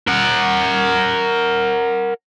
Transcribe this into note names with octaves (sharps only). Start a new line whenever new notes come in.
A#4 F#5